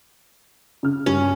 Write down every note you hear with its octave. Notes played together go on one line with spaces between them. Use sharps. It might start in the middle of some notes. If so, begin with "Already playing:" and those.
C#3 F6
G2 C#4